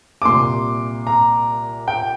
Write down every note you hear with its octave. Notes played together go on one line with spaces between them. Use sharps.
D6
C2 A#2 C6
A#5
G5